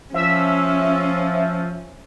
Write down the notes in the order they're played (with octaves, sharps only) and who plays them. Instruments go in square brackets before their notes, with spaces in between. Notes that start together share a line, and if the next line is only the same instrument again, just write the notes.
[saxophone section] F3 [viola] C#4 [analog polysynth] E5